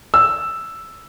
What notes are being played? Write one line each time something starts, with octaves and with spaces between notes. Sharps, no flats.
E6